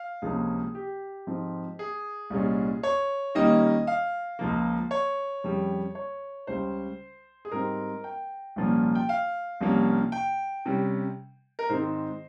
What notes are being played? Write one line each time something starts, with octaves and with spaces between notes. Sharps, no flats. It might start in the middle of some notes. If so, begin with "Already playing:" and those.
Already playing: F5
C#2 C3 F3 A#3 C#4 G#4
G4
G#2 F3 C4
G#4
C2 A#2 G#3 C#4
C#5
D#2 D#3 G3 A#3 C#4 D#5
F5
C#2 C#3 F3 A#3
C#5
F2 C#3 G3
C#5
C#2 C#3 G3 C#4 C5
G#4
G#2 G3 C4 A#4
G5
C2 A#2 F3 A#3 C#4
G5
F5
C2 C3 F3 A#3 C#4
G5
C3 G3 C#4
A#4
G#2 D#3 G#3 C4 C5